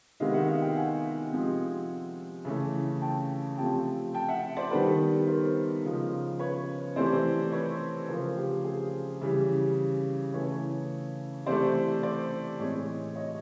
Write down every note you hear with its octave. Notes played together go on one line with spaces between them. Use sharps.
C3 D#3 G#3 B3 D#5 F5
E5 F#5
D#5 F5
F5 G5
F#5 G#5
C3 F3 G#3 C4
C#3 E3 A3
G5 A5
C3 F3 A3 C4 G5 A5
G5 A5
E5 F#5
C5 D5
D#3 G3 B3 A4 B4
A#4 C5
C#3 F3 G#3
B4 C#5
C3 E3 A3 C4 C5 D5
B4 C#5
C#3 F3 A3 A#4 C5
G4
G#4
C#3 E3 G3
C#3 E3 A3 B4 C#5
C3 E3 A3 C5 D5
C5 D5
A2 E3 G#3 C4 C#5 D#5
C#5 D#5